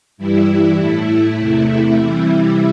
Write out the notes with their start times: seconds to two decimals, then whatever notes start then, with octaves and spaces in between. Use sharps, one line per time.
0.17 G2 E3 G3 E4
0.77 A2 A3
1.36 E2 C3 A3
1.96 C3 E3 G3